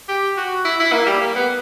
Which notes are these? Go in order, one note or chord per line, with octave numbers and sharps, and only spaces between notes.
G4
F#4
E4
E4
A#3
G3
A#3
B3